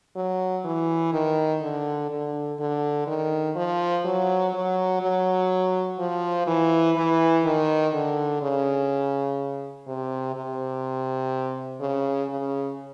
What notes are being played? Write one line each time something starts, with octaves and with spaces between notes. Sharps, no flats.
F#3
E3
D#3
D3
D3
D3
D#3
F3
F#3
F#3
F#3
F3
E3
E3
D#3
D3
C#3
C3
C3
C#3
C#3